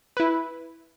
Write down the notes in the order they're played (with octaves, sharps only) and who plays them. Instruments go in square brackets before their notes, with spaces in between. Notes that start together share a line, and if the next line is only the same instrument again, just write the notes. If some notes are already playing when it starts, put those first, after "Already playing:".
[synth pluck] E4 B4